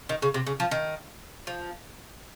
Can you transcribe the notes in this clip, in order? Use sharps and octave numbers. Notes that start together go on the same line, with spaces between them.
D#3
C#3
C3
C#3
F3
D#3
F3